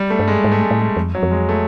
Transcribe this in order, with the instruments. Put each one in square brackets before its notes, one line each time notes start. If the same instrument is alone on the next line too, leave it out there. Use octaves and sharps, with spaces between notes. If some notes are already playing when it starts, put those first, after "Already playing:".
Already playing: [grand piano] G3
A3
[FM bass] G2
[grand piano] G#3
[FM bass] G#2
[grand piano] A3
G#3
[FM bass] A2
[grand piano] G#3
[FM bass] F2
[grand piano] F#3
[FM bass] F2
[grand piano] G#3
A3